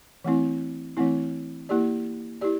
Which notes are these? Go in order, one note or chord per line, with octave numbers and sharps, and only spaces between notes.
E3 A3 C4 E4
E3 A3 C4 E4
A#3 E4 G4 D5
E4 G4 D5